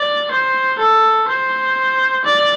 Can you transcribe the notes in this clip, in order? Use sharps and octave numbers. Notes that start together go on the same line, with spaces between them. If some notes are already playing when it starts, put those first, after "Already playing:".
Already playing: D5
C5
A4
C5
D5